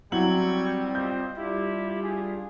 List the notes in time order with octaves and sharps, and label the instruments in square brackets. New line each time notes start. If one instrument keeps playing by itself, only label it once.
[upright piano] F#3 E4 F#7 [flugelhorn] G3 [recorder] C4 [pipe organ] G5 C#6 G#6
[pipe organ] F4 C5 D#5 [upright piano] G6
[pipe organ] G3 D4 F4 [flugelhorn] E4 [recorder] G4
[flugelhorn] G#4